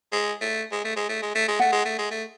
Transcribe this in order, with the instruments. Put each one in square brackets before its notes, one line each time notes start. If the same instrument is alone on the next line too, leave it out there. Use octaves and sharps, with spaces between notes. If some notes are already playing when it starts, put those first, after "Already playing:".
[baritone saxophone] G#3
A3
G#3
A3
G#3
A3
G#3
A3
G#3
[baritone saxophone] A3 [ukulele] F#5
[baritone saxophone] G#3
A3
G#3
A3